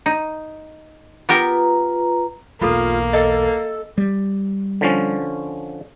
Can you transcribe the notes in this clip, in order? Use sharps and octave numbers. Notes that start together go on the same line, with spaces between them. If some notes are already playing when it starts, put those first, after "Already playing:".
D#4
B3 F4 G4 A#4 B4 A#5
B1 E2 A#3 F4 A4 B5
A4 D#5
G3
D3 F3 C#4